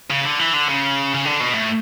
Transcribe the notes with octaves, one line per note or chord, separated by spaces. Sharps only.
C#3
D3
E3
D3
C#3
C#3
D3
B2
A2